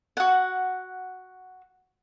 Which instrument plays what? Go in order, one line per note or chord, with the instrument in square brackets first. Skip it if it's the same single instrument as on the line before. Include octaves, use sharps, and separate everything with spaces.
[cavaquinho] F#4 F#5